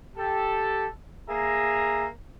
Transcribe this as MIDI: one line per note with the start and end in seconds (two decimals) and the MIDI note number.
0.17 0.86 67
0.17 0.86 69
1.29 2.07 58
1.29 2.07 68
1.29 2.07 76
1.29 2.07 82